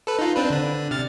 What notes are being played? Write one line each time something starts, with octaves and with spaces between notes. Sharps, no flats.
A4 B4
D#4 F4
C4 D4 B4
D3 D4
C3 F6 A6